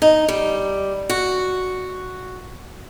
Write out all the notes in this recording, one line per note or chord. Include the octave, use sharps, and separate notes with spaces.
D#4
G3
F#4